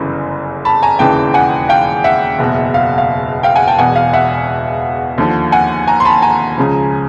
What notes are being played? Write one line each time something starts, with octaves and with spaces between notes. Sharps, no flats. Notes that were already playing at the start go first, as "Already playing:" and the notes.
Already playing: G1 F#2 C#3 E3
A5 B5
G#5 A#5
E1 D#2 C#3 E3 G5 A5
F#5 G#5
F5 G5
E5 F#5
F#1 E2 B2
F5
F5
F5 G5
F#5 G#5
G5 A5
E1 E2 B2 F#5 G#5
F5
E5 F#5
D#2 D3 F3
F#5 G#5
G#5 A#5
C6
A5 B5
G#5 A#5
C#2 C#3 F3